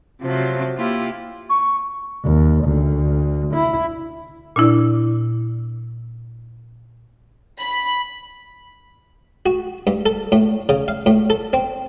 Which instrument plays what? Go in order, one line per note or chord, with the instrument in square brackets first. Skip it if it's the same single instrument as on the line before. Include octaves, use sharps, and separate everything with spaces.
[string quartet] C3 F3 F#3 A3
A#3 E4 F4 G4
[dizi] C#6
[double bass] D#2
D2
E4
[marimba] A#2 D4 E4 D5
[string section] B5
[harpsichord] F#4
G2
A4
A2
C#3
F5
A2
A4
C4